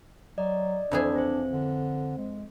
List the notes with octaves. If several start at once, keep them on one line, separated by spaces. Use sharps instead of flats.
F#3 D5 D#5
F2 E3 D4 G#4
C4 C5
D3
G#3